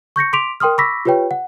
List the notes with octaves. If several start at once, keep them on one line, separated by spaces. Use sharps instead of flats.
C#6 G6 A#6 C#7
C6 D6 B6 D7 F7
A#4 G5 C6 D#6 F6
B5 C#6 D6 E6 A#6 B6
F4 G4 B4 C#5 G5
F#5